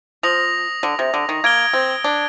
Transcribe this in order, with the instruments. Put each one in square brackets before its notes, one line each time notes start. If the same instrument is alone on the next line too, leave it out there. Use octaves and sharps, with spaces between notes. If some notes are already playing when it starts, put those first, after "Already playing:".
[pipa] F3 [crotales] D#6 A#6 F7
[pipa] D3
C3
D3
D#3
[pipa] A#3 [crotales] G#6 D7 G7
[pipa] C4
D4